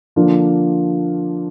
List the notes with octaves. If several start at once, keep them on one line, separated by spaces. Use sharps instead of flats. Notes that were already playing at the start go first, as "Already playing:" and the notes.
D3 F3 A#3 D4 F4